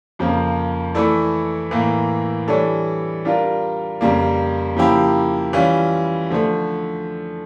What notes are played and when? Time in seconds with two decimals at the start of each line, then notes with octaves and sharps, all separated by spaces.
0.19 F2 C#3 F3 A#3
0.95 E3 A3 E4 A4 D5
1.71 A2 E3 A#3
2.48 E3 G3 D4 A4 C#5
3.25 G3 D4 F4 A#4
4.01 F2 C#3 G3 A#3
4.77 C#3 F3 A#3 E4 G4
5.53 E3 G3 C#4 F4
6.30 D3 F3 A3